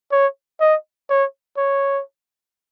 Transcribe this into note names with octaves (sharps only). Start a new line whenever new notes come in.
C#5
D#5
C#5
C#5